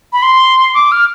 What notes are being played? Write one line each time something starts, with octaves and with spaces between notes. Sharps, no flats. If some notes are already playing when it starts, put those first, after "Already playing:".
B5
C6
D6
F6